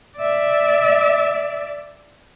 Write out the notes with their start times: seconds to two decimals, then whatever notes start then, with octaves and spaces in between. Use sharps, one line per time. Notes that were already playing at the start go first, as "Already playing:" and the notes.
0.17 D5 E5